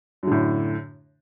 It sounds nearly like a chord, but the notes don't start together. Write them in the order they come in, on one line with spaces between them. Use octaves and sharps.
F#2 D3 A2